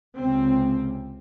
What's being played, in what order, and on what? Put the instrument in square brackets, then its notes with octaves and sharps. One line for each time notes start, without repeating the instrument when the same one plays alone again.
[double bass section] C#2 C3 C4